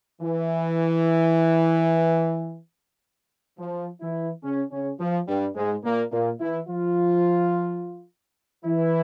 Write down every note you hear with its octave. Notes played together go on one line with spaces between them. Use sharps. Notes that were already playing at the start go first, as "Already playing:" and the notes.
E3
F3
E3 E4
C#3 C#4
C#3 C#4
F3
G2 G3
G#2 G#3
A#2 A#3
A#2 A#3
E3 E4
F3 F4
E3 E4